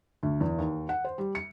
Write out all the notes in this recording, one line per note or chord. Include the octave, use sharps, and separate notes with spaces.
D2
E2
D#2
F#5
C5
G3
C#7